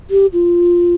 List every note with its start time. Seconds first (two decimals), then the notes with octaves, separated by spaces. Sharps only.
0.10 G4
0.33 F4